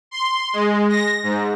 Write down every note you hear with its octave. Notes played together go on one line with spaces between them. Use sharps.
C6
G#3
A#6
G#2